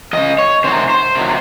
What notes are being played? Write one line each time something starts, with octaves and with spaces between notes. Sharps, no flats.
C#3 F3 D#5
C#5
C3 D#3 F#3 C5
C5
C3 D#3 F#3